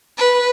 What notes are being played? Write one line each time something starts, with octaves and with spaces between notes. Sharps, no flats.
B4